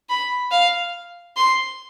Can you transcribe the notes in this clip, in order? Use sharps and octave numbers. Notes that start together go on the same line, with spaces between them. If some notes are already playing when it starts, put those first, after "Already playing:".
B5
F5
C6